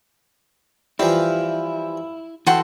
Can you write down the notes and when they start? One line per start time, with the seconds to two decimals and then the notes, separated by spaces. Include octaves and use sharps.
0.99 E3 F3 G3 E4 F5
2.47 E3 F#4 A4 F#5 G5 A5 C6